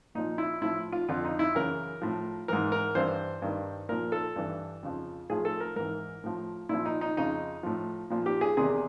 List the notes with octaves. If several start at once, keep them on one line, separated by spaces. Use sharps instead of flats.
A#2 F3 D#4
E4
A2 F3 E4
F4
F2 D3 F3 F4
D#4
E4
F#2 C#3 E3 A#4
A2 F3
G#2 E3 A#4
A#4
G2 E3 C5
G2 D#3
A#2 F3 A#4
A4
G2 E3
F2 C#3 F3
A2 F3 G#4
A4
A#4
G#2 E3 A#4
A2 F3
A#2 F3 E4
D#4
D#4
F2 C#3 F3 D#4
A2 F3
A#2 F3
G4
G#4
E2 C3 D#3 G#4